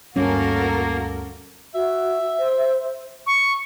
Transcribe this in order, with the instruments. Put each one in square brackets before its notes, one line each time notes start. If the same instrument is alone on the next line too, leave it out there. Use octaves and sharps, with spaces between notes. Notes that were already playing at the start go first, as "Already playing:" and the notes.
[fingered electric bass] D2 G2 G3 [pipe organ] A#3 [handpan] C#4 [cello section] F#4 A4 A#4
[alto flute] F#4 [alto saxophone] E5
[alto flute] C5
[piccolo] C#6